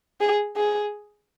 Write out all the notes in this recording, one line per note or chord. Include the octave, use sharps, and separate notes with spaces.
G#4
G#4